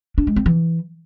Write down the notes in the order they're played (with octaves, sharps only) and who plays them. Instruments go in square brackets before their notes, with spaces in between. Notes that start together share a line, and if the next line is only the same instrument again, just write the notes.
[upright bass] D4
G#3
C4
E3